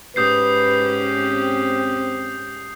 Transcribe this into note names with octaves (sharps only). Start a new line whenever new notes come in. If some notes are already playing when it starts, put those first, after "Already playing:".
G#2 C#4 G4 B4 D#6 G6 C7
C4